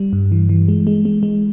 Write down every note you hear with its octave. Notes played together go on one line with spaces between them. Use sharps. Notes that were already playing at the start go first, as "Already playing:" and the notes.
Already playing: G3
G2
E3
E3
G#3
G#3
G#3
G#3